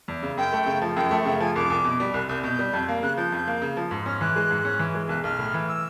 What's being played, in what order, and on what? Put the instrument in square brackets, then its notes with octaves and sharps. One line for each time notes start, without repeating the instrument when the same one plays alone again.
[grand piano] E2
C#3
[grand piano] F#2 [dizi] G5
[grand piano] A3
C#3
F3
[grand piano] F#2 [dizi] G5
[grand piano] A3
[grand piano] C#3 [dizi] G5
[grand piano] F3 [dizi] G#5
[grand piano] C2 [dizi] D6
[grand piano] C2
B2
G3
[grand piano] C2 [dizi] F#6
[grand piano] C2 [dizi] G6
[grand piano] B2 [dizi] G6
[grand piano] G3
F2
A#3
[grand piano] C#3 [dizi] F#6
[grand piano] F3 [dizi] G6
[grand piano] F2
A#3
C#3
F3
G#2
[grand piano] C#4 [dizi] F6
[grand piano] E3 [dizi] F#6
[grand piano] G#3
G#2
C#4
E3
G#3
[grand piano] B1 [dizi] F#6
[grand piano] B1 [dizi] F6
[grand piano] A2
E3
[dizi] E6